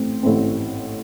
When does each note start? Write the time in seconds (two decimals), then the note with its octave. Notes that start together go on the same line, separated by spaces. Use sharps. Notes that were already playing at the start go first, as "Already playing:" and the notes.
Already playing: A1 A2 A3 C4
0.23 A1 A2 A3 C4